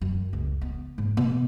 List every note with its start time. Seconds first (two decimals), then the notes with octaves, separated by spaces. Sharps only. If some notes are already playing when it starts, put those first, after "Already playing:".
0.01 F#2
0.33 C#2
0.61 B3
0.98 G#2
1.17 B2